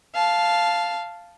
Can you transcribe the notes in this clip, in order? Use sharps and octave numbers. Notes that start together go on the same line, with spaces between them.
F5 A5